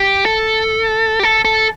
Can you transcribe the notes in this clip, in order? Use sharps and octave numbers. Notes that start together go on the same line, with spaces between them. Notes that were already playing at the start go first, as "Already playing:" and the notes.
Already playing: G4
A4
G4
A4
A4